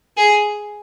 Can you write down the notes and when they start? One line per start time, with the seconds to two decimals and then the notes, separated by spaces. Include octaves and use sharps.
0.17 G#4